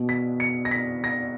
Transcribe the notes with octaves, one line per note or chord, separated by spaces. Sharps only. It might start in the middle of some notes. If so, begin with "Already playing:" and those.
Already playing: B2
B6
C#7
A#6
B6
A#6